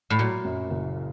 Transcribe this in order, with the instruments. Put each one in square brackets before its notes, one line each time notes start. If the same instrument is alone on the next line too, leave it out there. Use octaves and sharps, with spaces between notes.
[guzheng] A2
[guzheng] A#2 [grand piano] F#3
[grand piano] F#2
F#1